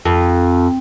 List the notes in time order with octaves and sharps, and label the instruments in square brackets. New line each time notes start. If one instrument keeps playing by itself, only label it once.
[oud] F2